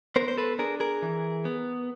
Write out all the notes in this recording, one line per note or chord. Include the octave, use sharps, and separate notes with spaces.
B3 A#4 C5
C5
A4 B4
D4 G#4 A#4
G#4 A#4
E3
B3